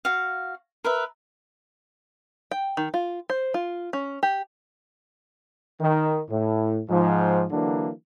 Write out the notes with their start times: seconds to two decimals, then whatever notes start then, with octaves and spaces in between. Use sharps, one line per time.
0.05 F#4 F5
0.84 A#4 B4 E5
2.51 G5
2.77 D#3
2.94 F4
3.30 C5
3.54 F4
3.93 C#4
4.23 G4
5.81 D#3
6.30 A2
6.90 G#2 F3
7.51 D3 E3 F#3 A#3 D4